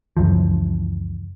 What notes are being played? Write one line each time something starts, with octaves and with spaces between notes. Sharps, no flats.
C#2 F#2 E3 F3